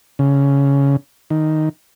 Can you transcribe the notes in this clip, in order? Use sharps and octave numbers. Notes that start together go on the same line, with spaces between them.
C#3
D#3